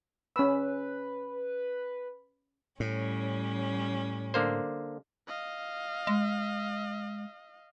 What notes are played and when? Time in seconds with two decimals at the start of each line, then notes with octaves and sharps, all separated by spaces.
0.36 C#4 B4 B5 E6
2.80 A2 G3 C#4
4.34 D3 A#3 C5
5.27 D#5 F5
6.07 G#3